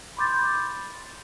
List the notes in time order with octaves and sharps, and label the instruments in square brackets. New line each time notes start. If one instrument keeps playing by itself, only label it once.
[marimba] B5 C6 D6 G6 A6